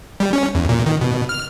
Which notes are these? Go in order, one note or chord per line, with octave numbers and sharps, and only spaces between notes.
G3
C#4
E2
A#2
D#3
B2
F6